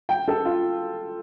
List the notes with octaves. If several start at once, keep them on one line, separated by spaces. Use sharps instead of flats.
G5
A4
F4